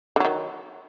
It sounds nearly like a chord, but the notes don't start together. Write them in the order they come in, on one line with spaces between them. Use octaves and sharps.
D3 F#3 D#3